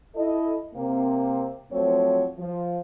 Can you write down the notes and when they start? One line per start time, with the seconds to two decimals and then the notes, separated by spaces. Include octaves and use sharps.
0.16 E4 A4 D#5
0.75 C3 A#3 C4
1.72 F3 F#3 A3 C4 C5 C#5
2.38 F3